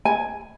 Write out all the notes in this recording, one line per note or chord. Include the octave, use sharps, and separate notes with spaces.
G#5